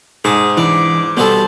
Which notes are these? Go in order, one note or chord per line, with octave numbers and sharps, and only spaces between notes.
G#2 G#4 A5 D#6
E3 D4 D6
B2 G3 B3 A4 C5 A5